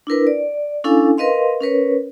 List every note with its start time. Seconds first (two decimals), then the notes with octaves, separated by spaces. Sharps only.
0.07 D4 E4 A#4 B4
0.27 D5
0.84 C#4 D4 E4 A4 F5 G#5
1.18 A#4 B4 D#5 F5 C6
1.61 C#4 A#4 B4 C#5